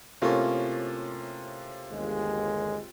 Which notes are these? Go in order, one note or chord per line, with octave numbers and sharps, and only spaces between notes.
A2 C3 A#3 C#4 F4
G1 D#2 G#3